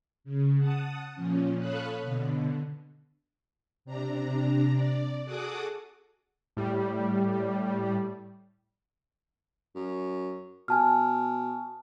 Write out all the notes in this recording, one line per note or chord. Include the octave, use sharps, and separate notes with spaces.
C#3
F#5 A5 D#6
A#2 F3 C#4
A4 C#5 F5 B5 D#6 F#6
B2 D3
C3 D4 A#5
D5
F#4 G#4 A4 F#5 D6 D#6
A2 G3
F#2
B2 G#5 A5 F6